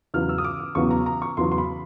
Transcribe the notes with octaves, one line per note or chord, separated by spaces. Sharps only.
E2 C#3 F#3 B3 F6
E6
D#6
D6
D6
E2 C#3 F#3 B3 C#6
A#5
A#5
C#6
E2 C#3 F#3 B3 C6
C6
B5